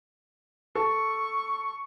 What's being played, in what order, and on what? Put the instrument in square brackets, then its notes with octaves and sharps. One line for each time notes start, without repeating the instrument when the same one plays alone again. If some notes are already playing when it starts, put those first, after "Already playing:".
[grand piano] A4 [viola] C#6